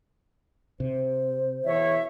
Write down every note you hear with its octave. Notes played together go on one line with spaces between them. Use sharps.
C3 C5
E2 B2 C#5 E5